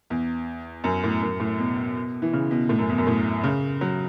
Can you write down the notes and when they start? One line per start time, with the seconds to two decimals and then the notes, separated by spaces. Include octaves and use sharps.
0.10 E2
0.84 F#2
1.04 A2
1.22 F#2
1.40 A2
1.59 B2
2.22 E3
2.33 C#3
2.51 B2
2.69 A2
2.79 F#2
2.89 E2
2.98 F#2
3.07 A2
3.43 C#3
3.81 F#3